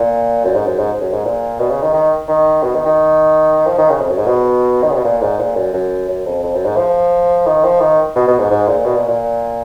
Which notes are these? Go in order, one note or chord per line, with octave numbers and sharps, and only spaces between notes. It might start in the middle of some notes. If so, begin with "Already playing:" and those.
Already playing: A#2
F#2
G#2
F#2
G#2
F#2
G#2
A#2
B2
C#3
D#3
D#3
D#3
B2
D#3
D#3
F3
D#3
C#3
F2
F#2
G#2
B2
D#3
C#3
B2
A#2
G#2
A#2
F#2
F#2
F#2
F2
F2
F#2
G#2
F3
D#3
F3
D#3
B2
B2
G#2
G#2
A#2
B2
A#2
A#2